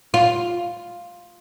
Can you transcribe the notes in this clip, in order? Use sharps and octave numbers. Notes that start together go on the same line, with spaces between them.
F4